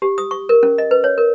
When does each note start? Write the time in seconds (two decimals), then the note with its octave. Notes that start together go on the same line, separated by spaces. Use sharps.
0.02 G4
0.18 D#6
0.31 C#6
0.49 A#4
0.63 C#4
0.78 D#5
0.91 B4
1.04 C#5
1.18 A#4